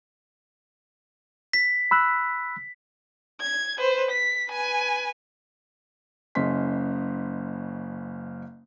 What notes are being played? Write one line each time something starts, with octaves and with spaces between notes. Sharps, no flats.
B6
B5 E6 F#6
G#6
B4 C5
B6
B4 G#5
F#1 C#3 C#4 D#5 C6 B6